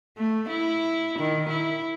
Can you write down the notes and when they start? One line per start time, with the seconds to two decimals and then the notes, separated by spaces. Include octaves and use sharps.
0.18 A3
0.49 E4
1.19 D#3
1.49 E4